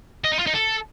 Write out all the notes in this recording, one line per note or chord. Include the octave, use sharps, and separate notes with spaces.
D#5
D#4
F4
D#4
A4